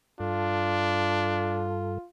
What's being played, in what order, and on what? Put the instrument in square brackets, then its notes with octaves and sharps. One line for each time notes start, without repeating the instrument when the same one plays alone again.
[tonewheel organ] G2 A4 [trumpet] D4 [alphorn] F4